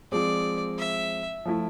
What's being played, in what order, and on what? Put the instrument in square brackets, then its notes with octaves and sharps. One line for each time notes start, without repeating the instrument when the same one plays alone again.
[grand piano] F3 G#3 C4 G#4 [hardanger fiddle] D5
[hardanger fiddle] E5
[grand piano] F3 A3 E4